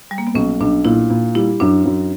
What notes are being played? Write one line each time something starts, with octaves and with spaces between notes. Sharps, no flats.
G3
A#3
B3
B1 C#4
B1 D4
A#2 E4
A#2
G3 E4
F#2 D4
F#2